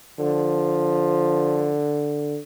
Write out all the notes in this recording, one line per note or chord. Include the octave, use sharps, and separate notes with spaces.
D3 F3